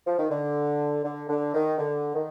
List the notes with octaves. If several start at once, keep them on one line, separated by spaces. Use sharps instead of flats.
F3
D#3
D3
D3
D3
D#3
D3
D#3